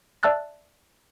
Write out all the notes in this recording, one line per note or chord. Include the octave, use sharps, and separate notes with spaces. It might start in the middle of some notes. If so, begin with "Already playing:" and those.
D5 E5 A5 E6 F#6 A6